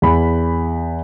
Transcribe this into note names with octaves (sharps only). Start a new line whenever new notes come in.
E2 B5